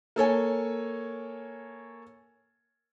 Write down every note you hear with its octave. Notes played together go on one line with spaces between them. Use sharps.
A#3 A4 C#5 G#5